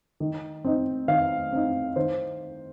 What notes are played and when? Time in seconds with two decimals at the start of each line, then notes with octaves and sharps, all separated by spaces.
0.20 D#3
0.65 C4 D#4
1.08 D#3 F5
1.52 C4 D#4
1.96 D#3 C5